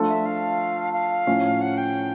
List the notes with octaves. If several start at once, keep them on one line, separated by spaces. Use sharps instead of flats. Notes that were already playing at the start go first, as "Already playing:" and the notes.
Already playing: F3 A3 D4 F4 A4
E5
F5
F5
A2 F3 A3 C#4 E4
F#5
G5